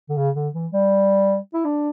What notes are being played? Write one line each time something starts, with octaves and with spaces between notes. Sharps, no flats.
D3
C#3
D3
E3
G3
E4
D4